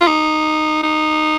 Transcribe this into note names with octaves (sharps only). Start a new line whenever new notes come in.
F4
D#4
D#4